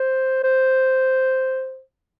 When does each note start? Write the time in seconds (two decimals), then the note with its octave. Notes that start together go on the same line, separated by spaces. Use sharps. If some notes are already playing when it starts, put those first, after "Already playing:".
Already playing: C5
0.44 C5